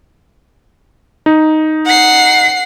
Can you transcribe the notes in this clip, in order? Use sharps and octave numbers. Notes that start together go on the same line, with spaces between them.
D#4
F#5 C7